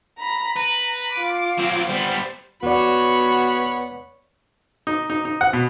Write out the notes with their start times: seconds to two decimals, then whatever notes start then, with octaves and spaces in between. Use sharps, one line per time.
0.18 A#5 B5
0.56 B4 A#5
1.14 F4 D6
1.58 F#3 C4
1.89 G3 B3 C5
2.63 E2 B3 F#4 C#5 D5 B5
4.87 D#4
5.10 D#4
5.25 D#4
5.41 F#5
5.53 B2